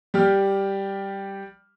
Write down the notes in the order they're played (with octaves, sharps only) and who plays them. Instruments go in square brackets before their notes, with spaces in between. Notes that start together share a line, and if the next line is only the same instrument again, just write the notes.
[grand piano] G3 G4 F6